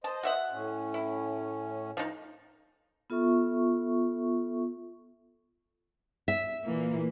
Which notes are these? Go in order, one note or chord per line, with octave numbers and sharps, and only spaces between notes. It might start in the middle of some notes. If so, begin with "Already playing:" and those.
C5 D#5 A5
F#4 E5 F#5
A2 C#4
E4
F3 D#4
B3 F4 A4 E5 C#6
E5
A#2 E3 A#3